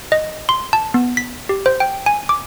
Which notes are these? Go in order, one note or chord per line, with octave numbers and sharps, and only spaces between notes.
D#5
C6
A5
B3
B6
G4
C5
G5
G#5
D6